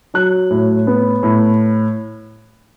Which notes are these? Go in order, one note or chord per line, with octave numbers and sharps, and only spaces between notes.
F#3 F#6
A2
B3
A2